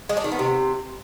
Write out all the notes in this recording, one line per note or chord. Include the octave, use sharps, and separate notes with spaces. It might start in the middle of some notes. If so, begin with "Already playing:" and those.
G#3
D4
D#3
B3
C3